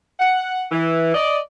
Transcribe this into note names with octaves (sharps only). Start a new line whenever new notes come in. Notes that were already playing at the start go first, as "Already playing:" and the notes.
F#5
E3
D5 D#5